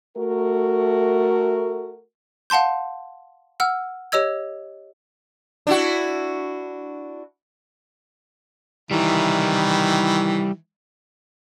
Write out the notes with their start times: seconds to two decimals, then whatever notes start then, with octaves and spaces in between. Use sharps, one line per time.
0.17 A3 F#4 A#4
2.50 F5 F#5 A5 C6 G6
3.60 F#5 E6 F6
4.12 G4 C#5 D#5 E6 G#6
5.67 D4 E4 F#4
8.91 D#3 E3 G3 E4